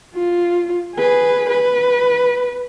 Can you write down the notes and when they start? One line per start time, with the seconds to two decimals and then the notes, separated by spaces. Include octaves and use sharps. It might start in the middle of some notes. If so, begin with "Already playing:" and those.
0.15 F4
0.96 G#4 B4
1.49 B4